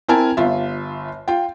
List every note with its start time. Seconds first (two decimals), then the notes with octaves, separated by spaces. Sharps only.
0.08 C4 E4 A#4 G#5 A5
0.37 G1 F4 E5
1.28 F4 G5